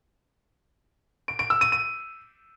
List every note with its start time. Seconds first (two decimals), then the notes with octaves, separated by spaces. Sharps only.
1.28 D7
1.39 D7
1.50 E6
1.61 D#7
1.72 D#7